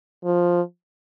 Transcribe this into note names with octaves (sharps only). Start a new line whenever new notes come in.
F3